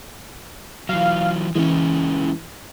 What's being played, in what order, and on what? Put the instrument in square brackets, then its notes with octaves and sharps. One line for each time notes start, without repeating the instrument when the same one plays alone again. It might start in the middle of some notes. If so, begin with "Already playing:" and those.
[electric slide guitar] E3 F#3 [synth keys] F5
[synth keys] E3 [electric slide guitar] G#3 A#3 C#4